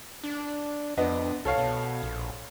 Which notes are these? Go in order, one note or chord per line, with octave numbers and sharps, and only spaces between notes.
D4
F2 B3 D4 D#5
C2 A4 C#5 F5
B2
A#1